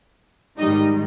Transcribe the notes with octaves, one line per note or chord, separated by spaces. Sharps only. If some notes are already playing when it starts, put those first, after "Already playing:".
G#2 D#3 G3 D#4 D#5